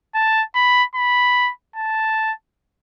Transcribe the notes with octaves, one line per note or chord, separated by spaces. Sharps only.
A5
B5
B5
A5